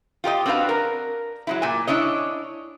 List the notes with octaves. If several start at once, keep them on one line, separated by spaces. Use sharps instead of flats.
F4 G4 A#4 D#5
C4 D4 F#4 B4 F5
A#4
F#3 G#3 E4
A#2 G#5
D4 E4 C#5 D#5